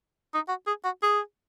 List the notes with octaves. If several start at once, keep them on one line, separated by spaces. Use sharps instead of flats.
D#4
F#4
G#4
F#4
G#4